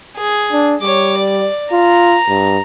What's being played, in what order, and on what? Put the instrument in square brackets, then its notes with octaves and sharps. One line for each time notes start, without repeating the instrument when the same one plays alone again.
[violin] G#4
[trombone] D4
[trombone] G3 [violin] C#5 D6
[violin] D5
[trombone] F4 [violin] A#5
[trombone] G2